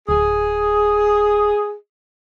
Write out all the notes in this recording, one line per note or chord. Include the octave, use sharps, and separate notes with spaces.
D1 G#4